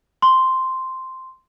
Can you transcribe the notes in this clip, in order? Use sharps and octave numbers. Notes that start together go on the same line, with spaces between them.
C6